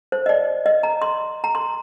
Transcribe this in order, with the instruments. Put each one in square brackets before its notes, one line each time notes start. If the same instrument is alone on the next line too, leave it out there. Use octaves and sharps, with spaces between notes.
[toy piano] C5
D#5
D5
D#5
A#5
C6
A#5
C6